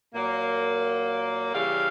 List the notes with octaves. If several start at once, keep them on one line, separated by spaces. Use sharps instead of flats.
A#2 F#3 A#3
C#3 E3 G3 F5